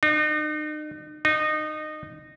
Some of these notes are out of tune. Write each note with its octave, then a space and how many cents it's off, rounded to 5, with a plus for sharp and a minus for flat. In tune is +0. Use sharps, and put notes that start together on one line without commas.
D#4 -40
D#4 -20